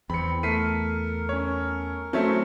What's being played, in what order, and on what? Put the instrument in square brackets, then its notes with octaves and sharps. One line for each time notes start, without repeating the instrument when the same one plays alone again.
[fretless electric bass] E2 [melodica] C4 [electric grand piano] B5 C#7
[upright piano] A3 [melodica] A#4 [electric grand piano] B6 C7 D#7
[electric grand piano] C#4 C#5
[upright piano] F#3 A3 C4 [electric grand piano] C#4 C#5 E5